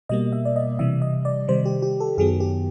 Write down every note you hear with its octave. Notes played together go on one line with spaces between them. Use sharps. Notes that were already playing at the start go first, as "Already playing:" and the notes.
B2 G3 A#3 D#5
E5
D5
D#5
C3 E3 G3 E5
D#5
D5
C3 D#3 G3 C5
G4
G4
A4
F#2 D#3 F#3 B3 G#4
G4